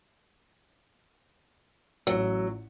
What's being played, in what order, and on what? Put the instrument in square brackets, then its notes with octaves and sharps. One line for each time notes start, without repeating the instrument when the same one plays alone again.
[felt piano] A1 E6 [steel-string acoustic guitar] F#3